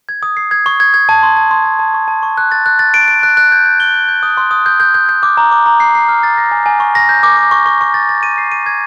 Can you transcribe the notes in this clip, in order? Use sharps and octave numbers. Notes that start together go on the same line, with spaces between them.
G#6
D#6
C7
G#6
C#6
G#6
G#6
A5
C6
A5
C6
A5
A5
C#6
A5
C#6
F#6
A6
F#6
A6
D7
D7
F#6
F#6
G6
G6
G7
G6
G6
D#6
C6
D#6
G6
G6
G6
G6
D6
A#5
D6
A#5
C7
C7
F6
A6
A#6
G#5
G#5
C#6
A#6
G6
D6
D6
C#6
C#6
C#6
A6
A6
D#7
C7
D#7
G#6